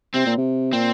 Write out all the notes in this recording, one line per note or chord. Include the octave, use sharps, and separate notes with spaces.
C3 C4
A#2
C3
A#2 C4